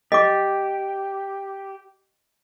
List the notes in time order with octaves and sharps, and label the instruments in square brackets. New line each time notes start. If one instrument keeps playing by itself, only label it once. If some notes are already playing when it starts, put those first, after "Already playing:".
[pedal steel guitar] G4 [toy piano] D#5 D6